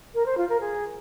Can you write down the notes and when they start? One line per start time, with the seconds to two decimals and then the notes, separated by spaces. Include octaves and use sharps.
0.14 A#4
0.26 C5
0.37 F4
0.49 A#4
0.60 G#4